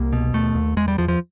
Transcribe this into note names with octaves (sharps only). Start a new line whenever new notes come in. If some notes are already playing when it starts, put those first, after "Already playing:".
Already playing: C2 A#3
B2
D#2 A3
D#2
E2 G#3
G3
E2 F3
F3